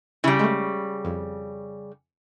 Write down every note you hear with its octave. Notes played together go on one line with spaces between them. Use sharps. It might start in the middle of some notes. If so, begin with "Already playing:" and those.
C#3 G3 E4
G#3 A3
F2